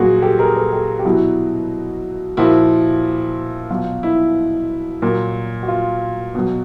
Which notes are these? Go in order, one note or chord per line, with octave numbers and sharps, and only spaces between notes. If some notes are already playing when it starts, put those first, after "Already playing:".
Already playing: A#2 F#3 F#4 G#4
G4 A4
G#4 A#4
A4 B4
G4 A4
G4
B2 F#3 E4 F#4
A#2 F3 E4 F#4
B2 F#3 F4
E4
A#2 F#3
F#4
F4
B2 F#3